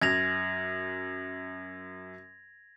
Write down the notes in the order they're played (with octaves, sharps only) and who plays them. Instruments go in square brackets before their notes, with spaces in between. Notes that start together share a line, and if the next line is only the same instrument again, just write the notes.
[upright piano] F#2 [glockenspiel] G#6 A#6 F7